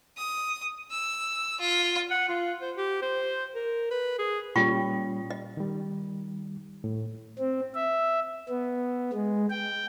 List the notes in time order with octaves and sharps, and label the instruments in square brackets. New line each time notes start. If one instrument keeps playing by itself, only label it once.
[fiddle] D#6
E6
F4
[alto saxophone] F#5
F4
C5
G4
C5
A#4
B4
G#4
[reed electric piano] A#2 G3 C#4 [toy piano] F4 G5 C#6
[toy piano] D#5
[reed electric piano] D#3 G3
A2
[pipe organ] C4
E5
B3
G#3
G5